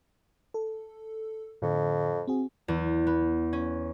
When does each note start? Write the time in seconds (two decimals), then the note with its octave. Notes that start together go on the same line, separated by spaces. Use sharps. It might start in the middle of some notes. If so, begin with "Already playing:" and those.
0.54 A4
1.62 F2 A2 D3
2.27 C4 F#4 G#4
2.68 E2
3.07 B3
3.53 C#4